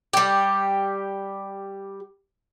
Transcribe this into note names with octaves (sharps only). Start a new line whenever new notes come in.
G3 G4